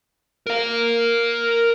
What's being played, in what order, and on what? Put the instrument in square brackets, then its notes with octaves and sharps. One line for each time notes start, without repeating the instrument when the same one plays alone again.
[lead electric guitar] A#4 F5